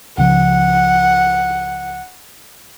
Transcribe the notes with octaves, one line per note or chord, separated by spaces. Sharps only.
C#2 C#3 F3 F#5